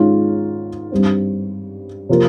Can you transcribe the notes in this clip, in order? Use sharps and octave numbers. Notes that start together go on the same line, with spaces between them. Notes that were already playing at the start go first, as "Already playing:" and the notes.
Already playing: G#2 D#3 G#3 C#4 F4
G2 G3 C4
C3 F3 A#3 F4 A#4